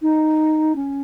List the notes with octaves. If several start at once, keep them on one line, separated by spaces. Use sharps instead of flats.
D#4
C#4